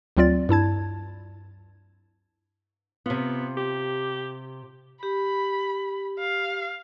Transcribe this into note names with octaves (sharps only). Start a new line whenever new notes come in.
D2 F#3 C4 F4 D5 A6
G2 E4 A5 G#6
C3 B3 F4
G4
G4 B5
F5